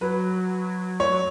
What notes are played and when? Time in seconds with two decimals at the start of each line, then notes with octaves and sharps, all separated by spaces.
0.01 F#3 B4
1.00 A3 C#5
1.10 F#3